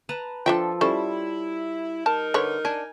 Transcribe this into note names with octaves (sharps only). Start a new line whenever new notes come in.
B4 A5 A#5
F3 D4 A4 E5 G5
G3 C#4 E4 A4 C5
D#4 A#4 A5
D3 B4 C#5
D4 G#5